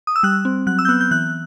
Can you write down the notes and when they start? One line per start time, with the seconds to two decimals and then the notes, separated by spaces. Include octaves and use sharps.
0.07 D#6
0.16 E6
0.23 G3 F#6
0.45 C4
0.67 F#3 F#6
0.79 E6
0.85 G6
0.89 B3 F#6
1.01 G6
1.11 E3 F#6